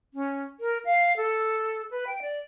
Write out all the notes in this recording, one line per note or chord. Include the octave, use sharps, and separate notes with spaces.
C#4
A#4
F5
A4
B4
G5
D5